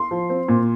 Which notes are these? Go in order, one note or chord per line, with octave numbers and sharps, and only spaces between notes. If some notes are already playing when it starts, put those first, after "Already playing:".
Already playing: C6
F3
C4
A#2